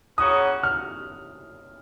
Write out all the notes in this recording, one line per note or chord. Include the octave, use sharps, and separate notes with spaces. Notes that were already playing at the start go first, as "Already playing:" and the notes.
C#3 F#3 A#3 C#4 F#4 D#6
F6